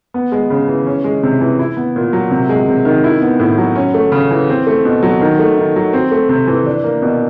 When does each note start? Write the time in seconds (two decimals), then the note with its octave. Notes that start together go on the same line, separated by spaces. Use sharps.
0.14 B3
0.32 G#3
0.50 C#3
0.68 E3
0.86 C#4
1.04 G#3
1.23 C3
1.41 E3
1.59 E4
1.76 B3
1.96 A#2
2.13 F#3
2.31 C3
2.49 G#3
2.68 C3
2.85 D#3
3.04 E4
3.21 B3
3.39 A2
3.58 F#3
3.76 C#4
3.94 A3
4.12 C#3
4.31 E3
4.49 C4
4.67 A3
4.85 B2
5.03 F#3
5.21 D#3
5.39 A3
5.57 D#3
5.76 F#3
5.93 C4
6.11 A3
6.29 C3
6.47 E3
6.66 D4
6.84 A#3
7.02 B2